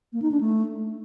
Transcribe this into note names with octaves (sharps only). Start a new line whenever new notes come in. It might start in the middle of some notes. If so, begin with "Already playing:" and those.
A#3
D#4
D4
A3